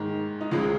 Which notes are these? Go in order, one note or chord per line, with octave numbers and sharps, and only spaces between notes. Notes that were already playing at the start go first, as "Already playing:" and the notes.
Already playing: G#2 D#3 G#3
D#4
C#2 C#3 F3 G#3 F4